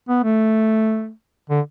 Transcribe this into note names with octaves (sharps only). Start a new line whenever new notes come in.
B3
A3
D3